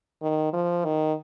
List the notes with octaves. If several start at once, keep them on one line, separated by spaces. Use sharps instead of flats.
D#3
F3
D#3